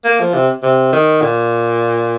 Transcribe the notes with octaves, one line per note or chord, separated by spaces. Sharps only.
A#3
F3
C3
C3
D#3
A#2